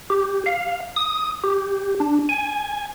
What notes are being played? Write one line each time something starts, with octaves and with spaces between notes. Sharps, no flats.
G4
F5
D#6
G4
D4
G#5